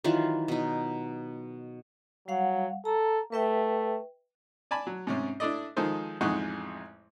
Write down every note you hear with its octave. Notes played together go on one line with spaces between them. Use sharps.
D#3 E3 F#3 F4
B2 D#4
F#3 G3 F5 F#5
A4 A#5
A3 B4 E5 G5
D5 G#5 A5 B5
F#3
G#2 C3 C#4
D4 E4 A4 D5 D#5
D#3 F3 G#3 D#4 A4 C5
A1 F2 G#3 D#4 F#5 C#6